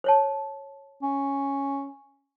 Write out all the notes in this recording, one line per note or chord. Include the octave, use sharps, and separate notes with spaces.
C5 C#5 A5
C#4